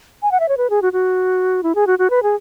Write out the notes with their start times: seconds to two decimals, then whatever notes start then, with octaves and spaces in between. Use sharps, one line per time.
0.23 G#5
0.32 F#5
0.40 E5
0.49 C#5
0.57 B4
0.70 G#4
0.82 F#4
0.93 F#4
1.63 E4
1.75 G#4
1.87 F#4
1.99 F#4
2.10 B4
2.23 G#4